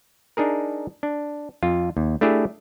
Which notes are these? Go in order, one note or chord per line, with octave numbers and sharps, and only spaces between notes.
D4 D#4 G#4 A#4
D4
F2 F4
D#2
A3 D4 E4 G4 G#4